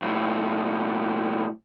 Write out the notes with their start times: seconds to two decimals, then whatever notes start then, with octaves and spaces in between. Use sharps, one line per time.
0.02 B1 A2